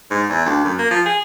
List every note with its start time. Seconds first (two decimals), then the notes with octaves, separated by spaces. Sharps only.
0.11 G#2
0.29 E2
0.46 D2
0.64 F#2
0.79 A#3
0.91 F3
1.06 G#4